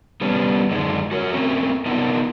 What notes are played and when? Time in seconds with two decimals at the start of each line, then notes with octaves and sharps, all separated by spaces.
0.21 G3 B3 C#4 D4
0.70 F#2 D3 G#3 D4 D#4
1.11 F#4 A#4 B4 C#5
1.33 A3 C4 C#4 A#4
1.86 B3 D4 D#4 F4 A#4